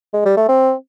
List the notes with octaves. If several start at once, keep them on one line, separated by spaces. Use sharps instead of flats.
G#3
G3
A3
C4